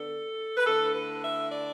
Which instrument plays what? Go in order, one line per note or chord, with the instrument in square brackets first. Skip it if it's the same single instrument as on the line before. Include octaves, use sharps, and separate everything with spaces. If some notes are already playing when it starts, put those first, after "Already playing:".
Already playing: [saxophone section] D3 B3 D4 A4
B4
D3 A3 E4 A4
B4
E5
D5